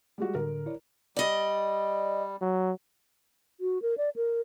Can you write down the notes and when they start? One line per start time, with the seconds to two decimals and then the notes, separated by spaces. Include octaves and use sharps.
0.18 G3 G#3 F#4
0.35 A2 D3 A#4
0.66 E4 C#5 D5
1.16 G3 D5 D#5
2.41 F#3
3.60 F#4
3.82 A#4
3.97 D5
4.16 A#4